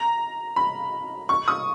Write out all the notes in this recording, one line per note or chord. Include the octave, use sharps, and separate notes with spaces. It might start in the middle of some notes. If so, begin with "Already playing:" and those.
Already playing: A#5
B5
C#6
D#6